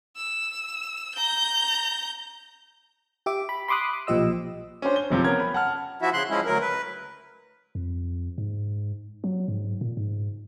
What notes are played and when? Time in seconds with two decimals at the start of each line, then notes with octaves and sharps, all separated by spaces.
0.17 E6
1.15 A#5 G6
3.26 G4 E5 D6
3.49 B5
3.68 B5 C6 D6 D#6 F#6
3.93 D6
4.07 B1 A#2 F3 G4 D#5 E6
4.82 C#4 D4 C5
4.96 G7
5.10 F#1 C3 F3
5.23 B3 C#4 A#4 G#6
5.40 B5
5.54 F#5 A5 F6
6.02 F3 E4 F#4 E5
6.13 C#3 C6 F#6
6.30 F3 G#3 C#4 E4
6.45 D2 F#3 A#4
6.61 B4
7.75 F2
8.38 G#2
9.24 F#3
9.48 G#2
9.81 A#2
9.97 G#2